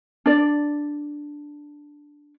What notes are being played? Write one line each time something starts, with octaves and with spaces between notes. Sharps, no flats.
D4 D5